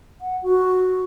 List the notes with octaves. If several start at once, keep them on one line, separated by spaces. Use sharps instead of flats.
F#5
F#4